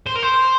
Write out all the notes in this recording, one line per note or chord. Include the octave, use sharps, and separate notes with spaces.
C5
A#4
C5